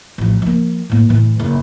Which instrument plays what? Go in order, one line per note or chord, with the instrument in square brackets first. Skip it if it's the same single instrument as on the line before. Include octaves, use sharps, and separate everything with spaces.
[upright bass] A1 F3
F3 A#3
A2 A#3
A2 E3
F#1